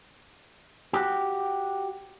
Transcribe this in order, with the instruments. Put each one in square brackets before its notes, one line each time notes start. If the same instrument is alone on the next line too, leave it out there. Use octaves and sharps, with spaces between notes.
[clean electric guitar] F#4 G4